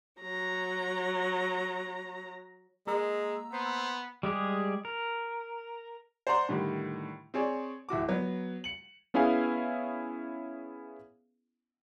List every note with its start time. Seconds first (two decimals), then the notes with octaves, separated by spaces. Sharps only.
0.22 F#3 A#5
2.87 G#3 A#3 A#5 E6
3.53 B3 C5
4.23 G3 G#3 G4 G#4
4.85 A#4
6.27 C5 D5 F#5 A#5 C6
6.49 A2 D3 D#3 G3
7.34 C4 G#4 C#5 D5
7.89 D1 E4 F#4 D6
8.09 F#3 B3
8.64 C#7 F#7
9.14 B3 C#4 E4 G#4 F5 G#5